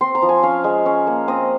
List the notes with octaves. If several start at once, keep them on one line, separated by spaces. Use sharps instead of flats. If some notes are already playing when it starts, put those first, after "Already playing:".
C4 C6
A#5
F3
G#5
C#4 F5
G#3
C#4
A#3
C4 D#5